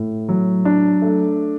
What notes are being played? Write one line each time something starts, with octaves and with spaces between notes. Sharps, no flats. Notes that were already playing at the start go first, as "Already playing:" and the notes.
Already playing: A2
F#3
D4
A3